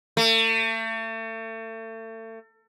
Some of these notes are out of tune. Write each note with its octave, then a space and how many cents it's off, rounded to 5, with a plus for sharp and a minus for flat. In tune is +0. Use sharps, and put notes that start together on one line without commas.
A3 +35